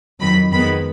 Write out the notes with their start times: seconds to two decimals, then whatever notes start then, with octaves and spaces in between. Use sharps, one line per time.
0.20 F2 D#3 F#3 B5
0.52 F2 D#3 G#3 B3 B5